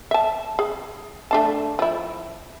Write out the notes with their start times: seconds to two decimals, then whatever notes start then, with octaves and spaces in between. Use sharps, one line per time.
0.11 E5 A5
0.59 G#4
1.31 A3 D4 A5
1.79 F3 E4